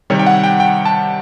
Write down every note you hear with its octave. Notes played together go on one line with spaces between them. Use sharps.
C3 D#3 G3 C#5
G5
F#5
G5
G5
A5